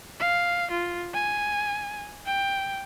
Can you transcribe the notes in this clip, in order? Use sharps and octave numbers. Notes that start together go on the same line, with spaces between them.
F5
F4
G#5
G5